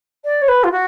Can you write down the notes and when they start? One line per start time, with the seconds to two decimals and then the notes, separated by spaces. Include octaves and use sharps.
0.24 D5
0.42 C#5
0.48 B4
0.64 F4
0.72 F#4